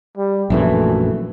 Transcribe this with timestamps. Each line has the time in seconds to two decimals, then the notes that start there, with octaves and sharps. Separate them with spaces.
0.18 G3
0.50 A#1 F#2 E3 A3